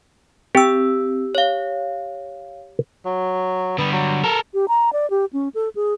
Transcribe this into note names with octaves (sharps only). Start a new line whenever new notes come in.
C4 G4 E6
C#5 F5
F#3
D3 G3 B3
F#3
A4 A#4
G4
A#5
D5
G4
C#4
A4
G#4